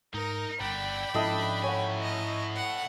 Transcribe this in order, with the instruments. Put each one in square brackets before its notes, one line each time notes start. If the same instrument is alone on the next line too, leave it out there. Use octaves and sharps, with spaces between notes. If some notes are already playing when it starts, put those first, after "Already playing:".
[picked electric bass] G#2 [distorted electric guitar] D#4 [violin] A#4
[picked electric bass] G1 [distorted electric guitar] D5 F#5 [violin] G5 B5
[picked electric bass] G#2 F3 C#4 [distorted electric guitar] D4 [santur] E4 A4 D#5
[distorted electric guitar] A2 G#5 [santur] C#5 F#5
[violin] D#5
F#5